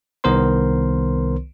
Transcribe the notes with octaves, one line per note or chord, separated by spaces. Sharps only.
C2 D#3 B3 A#4 C5 C6